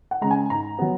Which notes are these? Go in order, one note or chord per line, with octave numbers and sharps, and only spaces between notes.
F#5
C#3 G#3 A#5
G#5
G#2 A#5
F#3 B3